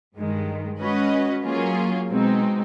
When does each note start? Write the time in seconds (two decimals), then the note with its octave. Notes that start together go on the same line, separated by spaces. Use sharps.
0.15 G2 D#3 G#3
0.80 G#3 C#4 F#4 B4 D#5
1.45 F#3 A#3 C#4 F4 G#4
2.10 B2 G#3 C4 D#4